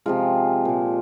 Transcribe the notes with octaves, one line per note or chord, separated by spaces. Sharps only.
C3 F3 G#3 F4
A#2 G#3